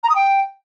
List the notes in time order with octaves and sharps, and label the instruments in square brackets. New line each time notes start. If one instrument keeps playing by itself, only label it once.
[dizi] A#5
D#6
G5